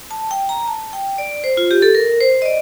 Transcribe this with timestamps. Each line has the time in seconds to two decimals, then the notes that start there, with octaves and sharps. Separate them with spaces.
0.11 A5
0.31 G5
0.49 A#5
0.68 A5
0.93 G5
1.18 D5
1.44 C5
1.57 F4
1.71 G4
1.82 A4
1.95 A#4
2.20 C5
2.42 D#5
2.45 D5